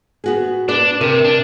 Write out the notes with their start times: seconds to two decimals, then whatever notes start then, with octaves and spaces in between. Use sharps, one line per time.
0.24 B3 F#4 G#4
0.69 D4 B4 D5
1.01 C3 A#4
1.25 D4